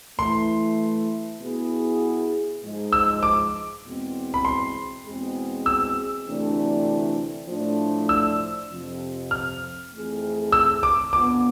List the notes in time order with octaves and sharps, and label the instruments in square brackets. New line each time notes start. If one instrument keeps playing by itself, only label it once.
[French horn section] E3 A3 E4 [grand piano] C6
[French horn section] B2 B3 E4 G#4
G#2 F3 G#3
[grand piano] E6
D6
[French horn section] E2 B2 G#3 C4
[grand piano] B5
C6
[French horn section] E2 B2 G#3 C4 G#4
[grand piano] E6
[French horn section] D2 C3 E3 A3 D4
A2 F3 A3 D4 F4
[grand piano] E6
[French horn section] F2 C3 F3
[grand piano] F6
[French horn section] F2 E3 A3 C4 G#4
[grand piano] E6
D6
[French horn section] F2 D3 F3 B3 [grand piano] D6